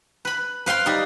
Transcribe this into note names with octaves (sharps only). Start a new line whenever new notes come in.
B4 B5
B4 F5 G5 C6
G3 D#4